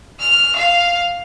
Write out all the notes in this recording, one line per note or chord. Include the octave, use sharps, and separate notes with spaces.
F6
F5